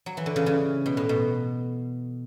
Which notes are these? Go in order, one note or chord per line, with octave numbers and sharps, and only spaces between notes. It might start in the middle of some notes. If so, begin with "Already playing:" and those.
F#3
E3
D3
C#3 E3
C#3
B2
A2
B2